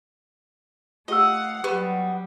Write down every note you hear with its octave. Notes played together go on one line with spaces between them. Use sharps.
A3 F4 G4 D#5 F5 F#5 E6
F#3 G3 B3 G4 B5